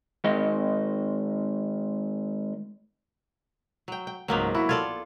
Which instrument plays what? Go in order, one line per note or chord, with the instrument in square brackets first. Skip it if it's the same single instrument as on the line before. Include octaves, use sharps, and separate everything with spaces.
[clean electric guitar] D#3 G#3 D#5
[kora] F#3 G5
G5
[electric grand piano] C#2 G#2 [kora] F#3 A#3 B3
[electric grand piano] E4 E5 B5 [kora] F#4
[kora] F4 A4 D5 [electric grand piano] G#6